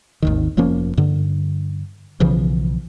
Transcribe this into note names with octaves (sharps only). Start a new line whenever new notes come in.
G#1 D#2 D#3
F1 F3 A#3 C#4
G2 D3
B1 C#3 E3 F3